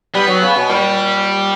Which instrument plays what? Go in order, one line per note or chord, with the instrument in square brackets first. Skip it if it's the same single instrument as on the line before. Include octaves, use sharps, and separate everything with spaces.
[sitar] G3 [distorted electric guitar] B3
[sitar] F#3
C#3
B2
[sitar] A#2 [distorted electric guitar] G3